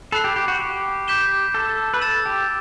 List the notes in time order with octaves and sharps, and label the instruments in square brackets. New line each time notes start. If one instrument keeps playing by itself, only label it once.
[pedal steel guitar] A4 [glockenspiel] B5 F#6 C7
[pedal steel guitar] G4
G4
F#4
G4
[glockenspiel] D6 G6 B6 E7 G7
[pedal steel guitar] A4
B4
[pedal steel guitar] A4 [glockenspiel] E6 A6 E7
[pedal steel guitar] G4